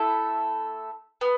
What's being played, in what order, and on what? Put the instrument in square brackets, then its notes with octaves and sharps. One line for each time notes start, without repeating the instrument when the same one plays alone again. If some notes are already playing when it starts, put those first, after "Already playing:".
Already playing: [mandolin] A3 E4 A4 E5
B3